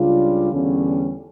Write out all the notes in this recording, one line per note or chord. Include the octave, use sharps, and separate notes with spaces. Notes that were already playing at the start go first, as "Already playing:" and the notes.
Already playing: C#2 C#3 G3 D4 F4
E2 D3 G3 C#4